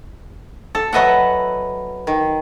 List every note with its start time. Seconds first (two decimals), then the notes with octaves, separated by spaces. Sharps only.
0.75 A4
0.93 F#3 B4 D#5 E5 F#5
2.07 D#3